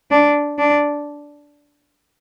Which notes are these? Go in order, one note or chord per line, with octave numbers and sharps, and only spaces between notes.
D4
D4